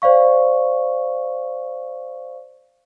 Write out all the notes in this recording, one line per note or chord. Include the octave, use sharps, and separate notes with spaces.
C5 D5 F5 C#6